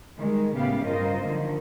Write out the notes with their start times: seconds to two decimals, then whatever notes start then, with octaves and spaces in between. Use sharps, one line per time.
0.18 D#3 G3 G#3
0.55 A2 C#3 B3 G4 F5
0.85 G2 C#4 F4 A#4 C5 D#5
1.25 D3 D#3 F3